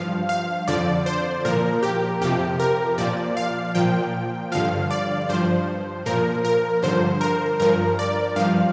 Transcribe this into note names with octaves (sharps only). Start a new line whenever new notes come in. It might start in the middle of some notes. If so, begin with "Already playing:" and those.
Already playing: G2 F3 F5
F5
F2 D3 F3 D5
C5
A#2 F3 A#4
G4
F2 C3 F3 G4
A#4
A#2 F3 D5
F5
A#2 F3 G5
G2 D3 F3 F5
D5
G2 F3 C5
A#2 F3 A#4
A#4
G2 D3 F3 C5
A#4
G2 F3 A#4
D5
G2 F3 F5